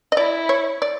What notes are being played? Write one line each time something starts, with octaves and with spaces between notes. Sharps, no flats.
D#5
E4 D5
C#5
D5